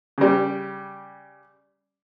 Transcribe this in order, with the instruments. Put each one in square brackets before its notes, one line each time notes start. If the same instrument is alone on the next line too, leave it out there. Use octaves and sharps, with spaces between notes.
[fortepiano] C#3 G3